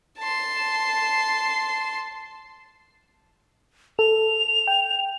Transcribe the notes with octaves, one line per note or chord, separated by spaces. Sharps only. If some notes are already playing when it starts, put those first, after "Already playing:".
A5 C6
A4 F7
G5